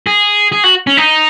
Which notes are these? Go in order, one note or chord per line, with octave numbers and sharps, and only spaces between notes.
G#4
G#4
F#4
C#4
D#4